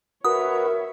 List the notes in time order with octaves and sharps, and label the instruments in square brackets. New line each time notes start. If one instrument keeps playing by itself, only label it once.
[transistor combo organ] F#4 B4 [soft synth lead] A#4 [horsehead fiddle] C#5 E5 [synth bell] D#6